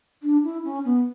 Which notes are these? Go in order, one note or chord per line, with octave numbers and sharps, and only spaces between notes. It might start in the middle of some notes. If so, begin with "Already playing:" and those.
D4
E4
C#4
B3